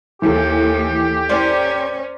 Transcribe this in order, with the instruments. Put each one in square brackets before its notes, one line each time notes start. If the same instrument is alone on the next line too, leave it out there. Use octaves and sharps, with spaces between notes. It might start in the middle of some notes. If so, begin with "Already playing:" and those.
[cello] D#2 [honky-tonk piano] E3 A4 [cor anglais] G4
[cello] C#4 [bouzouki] A#4 C5 D5